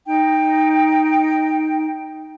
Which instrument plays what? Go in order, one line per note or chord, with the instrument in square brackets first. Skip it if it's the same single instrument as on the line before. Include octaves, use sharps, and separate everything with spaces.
[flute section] D#4 G5